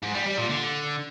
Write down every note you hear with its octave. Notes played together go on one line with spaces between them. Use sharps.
G#2
G3
G3
A#2
D3